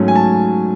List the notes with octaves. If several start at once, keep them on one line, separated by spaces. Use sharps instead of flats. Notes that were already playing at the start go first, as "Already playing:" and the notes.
Already playing: G#2 F#3 A3 C#4
G#5
A5